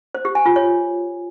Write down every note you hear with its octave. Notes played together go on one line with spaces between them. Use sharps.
C5
G4
G#5
F4
C#5